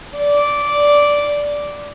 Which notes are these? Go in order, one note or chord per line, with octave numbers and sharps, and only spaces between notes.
D5